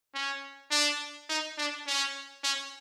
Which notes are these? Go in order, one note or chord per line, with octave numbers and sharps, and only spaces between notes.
C#4
D4
D#4
D4
C#4
C#4